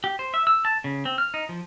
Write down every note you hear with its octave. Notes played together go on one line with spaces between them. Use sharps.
G4
C5
E5
E6
A5
C#3
C4
F6
D#4
F3